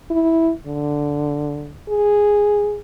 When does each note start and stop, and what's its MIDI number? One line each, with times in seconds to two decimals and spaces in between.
0.10 0.52 64
0.67 1.72 50
1.88 2.79 68